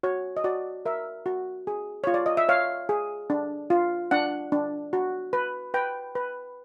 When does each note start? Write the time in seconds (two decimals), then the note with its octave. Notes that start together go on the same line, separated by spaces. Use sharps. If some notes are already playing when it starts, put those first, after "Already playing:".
0.03 F#4 C#5
0.37 D#5
0.44 F#4 D5
0.85 A#4 E5
1.26 F#4
1.67 G#4
2.04 F4 C#5
2.14 D5
2.26 D#5
2.37 E5
2.49 C#5 F5
2.89 G#4
3.30 D4
3.70 F4
4.11 D4 F#5
4.52 D4
4.93 F#4
5.33 B4
5.74 B4 G5
6.15 B4